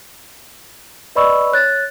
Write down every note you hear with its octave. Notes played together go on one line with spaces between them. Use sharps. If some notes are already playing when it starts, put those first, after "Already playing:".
B4 D5 D#5 B5 C#6 E6
C#5 F#6 A6